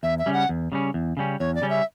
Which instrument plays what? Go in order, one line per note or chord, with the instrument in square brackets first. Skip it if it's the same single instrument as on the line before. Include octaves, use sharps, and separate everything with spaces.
[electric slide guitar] E2 [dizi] E5
[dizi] E5
[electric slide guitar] C#3 G3 C#4
[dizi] F#5
[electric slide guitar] E2
C#3 G3 C#4
E2
C#3 G3 C#4
[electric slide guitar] E2 [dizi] C#5
[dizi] D5
[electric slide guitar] C#3 G3 C#4
[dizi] E5